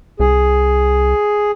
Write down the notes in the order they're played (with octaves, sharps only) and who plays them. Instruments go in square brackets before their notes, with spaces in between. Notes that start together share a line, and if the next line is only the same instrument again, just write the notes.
[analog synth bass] C2 [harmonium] G#4